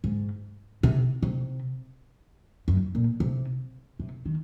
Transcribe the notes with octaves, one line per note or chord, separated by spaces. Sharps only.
G#2
C3
C3
F#2
A#2
C3
C3
D#3